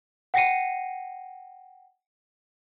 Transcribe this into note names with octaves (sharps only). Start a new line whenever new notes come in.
F#5 G5 A#6 C7 C#7 D#7